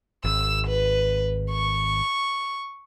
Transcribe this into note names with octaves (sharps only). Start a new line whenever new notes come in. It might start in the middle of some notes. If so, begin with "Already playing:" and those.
G#1 E6
B4
C#6